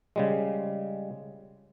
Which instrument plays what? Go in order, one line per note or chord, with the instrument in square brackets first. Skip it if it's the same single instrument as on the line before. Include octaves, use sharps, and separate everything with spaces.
[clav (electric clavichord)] C#3 G3 G#3